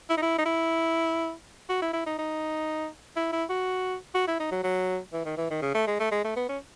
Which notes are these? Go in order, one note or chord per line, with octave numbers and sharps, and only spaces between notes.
E4
D#4
E4
D#4
E4
F#4
E4
E4
D#4
D#4
E4
E4
F#4
F#4
E4
D#4
F#3
F#3
E3
D#3
E3
D#3
C#3
A3
G#3
A3
G#3
A3
B3
C#4